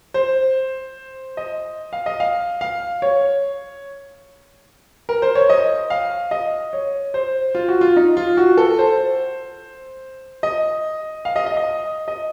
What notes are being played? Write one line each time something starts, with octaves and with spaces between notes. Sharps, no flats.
C5
D#5
F5
D#5
F5
F5
C#5
A#4
C5
C#5
D#5
F5
D#5
C#5
C5
F4
F#4
F4
D#4
F4
F#4
A4
C5
D#5
F5
D#5
D#5
D#5
D#5